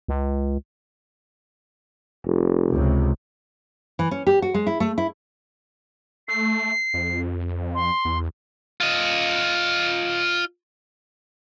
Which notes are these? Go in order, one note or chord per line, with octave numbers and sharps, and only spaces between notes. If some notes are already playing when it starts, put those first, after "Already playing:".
C#2
F1
C#2 C3
E3
C#4
G4
F#4
G#3
E4
A3
E4
A3 C7
F2
C6
E2
F4 D#5